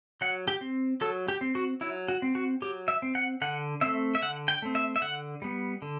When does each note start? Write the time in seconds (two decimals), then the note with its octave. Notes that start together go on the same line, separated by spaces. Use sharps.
0.21 F#3 F#5
0.48 G4
0.61 C4
1.01 F#3 A4
1.28 G4
1.41 C4
1.55 F#4
1.81 F#3 E4
2.08 F#4
2.22 C4
2.35 F#4
2.62 F#3 G4
2.88 E5
3.02 C4
3.15 F#5
3.41 D3 F#5
3.81 A3 C4 E5
4.15 E5
4.22 D3 F#5
4.48 G5
4.62 A3 C4
4.75 E5
4.96 E5
5.02 D3 F#5
5.42 G3 B3
5.82 D3